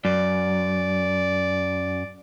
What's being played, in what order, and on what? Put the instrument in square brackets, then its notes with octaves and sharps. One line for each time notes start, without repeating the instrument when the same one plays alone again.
[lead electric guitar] F#2 [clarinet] D5